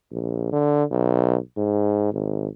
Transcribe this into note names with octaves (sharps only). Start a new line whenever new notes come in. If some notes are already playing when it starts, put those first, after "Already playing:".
A#1
D3
B1
G#2
G#1